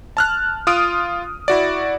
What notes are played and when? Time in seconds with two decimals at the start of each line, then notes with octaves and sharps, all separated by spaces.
0.17 A5 F6 F#6
0.67 F4 D#6 F6 D7
1.48 E4 F#4 D5